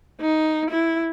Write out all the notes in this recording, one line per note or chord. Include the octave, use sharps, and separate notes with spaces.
D#4
E4